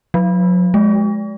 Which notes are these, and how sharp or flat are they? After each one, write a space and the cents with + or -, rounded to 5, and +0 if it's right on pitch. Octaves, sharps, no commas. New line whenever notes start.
F#3 -40
G#3 +20